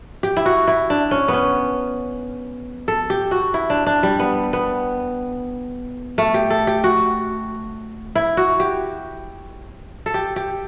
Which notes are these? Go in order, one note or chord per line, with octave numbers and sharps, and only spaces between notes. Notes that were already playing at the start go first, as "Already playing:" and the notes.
G4
E4
F#4
E4
D4
C#4
B3 C#4
A4
G4
F#4
E4
D4
D4
G3
B3
B3
A3
G4
A4
G4
F#4
E4
F#4
G4
A4
G4
G4